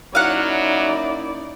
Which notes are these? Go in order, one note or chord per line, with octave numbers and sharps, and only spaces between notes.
F#3 A#3 C#4 D#4 E4 D5 F5 F#5